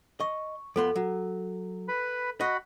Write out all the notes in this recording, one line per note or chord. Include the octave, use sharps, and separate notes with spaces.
D#5 C#6
F2 B3 A4 C6
F#3
B4 B5
F#4 D#5 F#5 B5